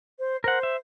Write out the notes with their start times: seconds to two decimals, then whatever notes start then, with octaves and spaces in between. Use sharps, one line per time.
0.19 C5
0.44 A#4 C5 F#5
0.63 E5